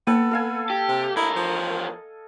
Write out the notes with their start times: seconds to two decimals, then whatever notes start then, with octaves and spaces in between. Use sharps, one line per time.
0.07 A#3 B3 A4
0.31 A4 F5 G#5
0.70 G4
0.89 C3
1.16 E2 E4 A#4 D#5
1.36 F3